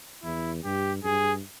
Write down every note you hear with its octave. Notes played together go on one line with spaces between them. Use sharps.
E2 E4
G2 G4
G2 G#4